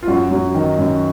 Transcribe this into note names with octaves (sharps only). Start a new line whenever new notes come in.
F4
F#2 F#4
F#3
D#3
F#2